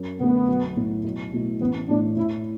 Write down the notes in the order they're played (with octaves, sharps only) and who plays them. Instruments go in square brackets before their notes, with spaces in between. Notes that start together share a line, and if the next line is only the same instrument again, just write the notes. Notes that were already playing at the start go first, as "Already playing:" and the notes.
Already playing: [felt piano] F#2
[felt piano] D3 A3 [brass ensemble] B3
[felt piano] B1
A2 A3 E4
B1
B2 A3 E4
[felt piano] A1 [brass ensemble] B3
[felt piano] A2 A3 [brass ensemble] D4
[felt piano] A2 [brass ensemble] E4